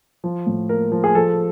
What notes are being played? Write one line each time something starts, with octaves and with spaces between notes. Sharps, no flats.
F3
A2
A#3 A#4
F3
G#4
F3 A4